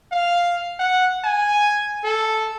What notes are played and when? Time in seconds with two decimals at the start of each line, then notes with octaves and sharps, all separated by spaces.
0.12 F5
0.79 F#5
1.24 G#5
2.04 A4